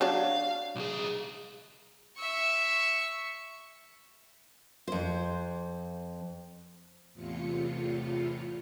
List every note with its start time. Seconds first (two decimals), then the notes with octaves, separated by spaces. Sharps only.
0.01 F#3 D4 C#5 F5
0.76 B1 G#4
2.17 E5 C#6
4.87 F2 C5
7.13 E2 A2 C3 F4 C#7